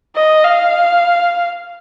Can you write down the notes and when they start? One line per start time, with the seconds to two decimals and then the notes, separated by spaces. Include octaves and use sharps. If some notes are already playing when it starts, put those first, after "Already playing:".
0.16 D#5
0.44 F5